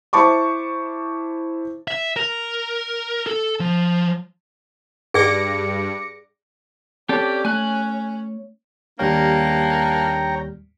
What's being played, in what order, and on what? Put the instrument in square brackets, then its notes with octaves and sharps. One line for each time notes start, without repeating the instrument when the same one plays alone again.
[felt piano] E4 C5 A5 C#6 D6
[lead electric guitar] E5
A#4
A4
F3
[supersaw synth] G2 [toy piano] G#4 D5 [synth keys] D6 A#6 C#7
[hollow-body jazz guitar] C4 A4 A5 [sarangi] C#4 [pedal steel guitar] G4 D5
[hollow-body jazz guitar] A3 [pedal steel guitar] G#5 F#6
[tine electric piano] D#2 G3 F6 [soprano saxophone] A#3 [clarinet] D4 [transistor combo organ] C#5 G5 A#5